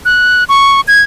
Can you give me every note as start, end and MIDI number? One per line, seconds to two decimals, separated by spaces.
0.05 0.44 90
0.49 0.81 85
0.88 1.02 92